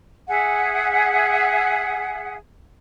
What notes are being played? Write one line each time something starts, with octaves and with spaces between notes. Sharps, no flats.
G#4 E5 F#5